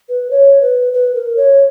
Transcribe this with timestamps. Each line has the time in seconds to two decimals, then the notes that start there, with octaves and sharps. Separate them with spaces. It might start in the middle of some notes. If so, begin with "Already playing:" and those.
0.09 B4
0.31 C#5
0.61 B4
0.93 B4
1.15 A#4
1.37 C#5